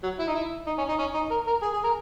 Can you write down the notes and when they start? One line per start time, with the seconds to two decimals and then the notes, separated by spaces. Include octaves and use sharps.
0.03 F#3
0.19 E4
0.27 D#4
0.34 E4
0.67 D#4
0.78 C#4
0.88 D#4
0.99 C#4
1.14 D#4
1.30 A#4
1.47 A#4
1.62 G#4
1.73 G#4
1.84 A#4